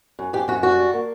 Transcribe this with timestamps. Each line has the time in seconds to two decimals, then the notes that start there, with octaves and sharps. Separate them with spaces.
0.19 F#2
0.33 F#2 G4
0.48 F#2 F#4
0.63 G3 F#4
0.78 D4
0.93 A#3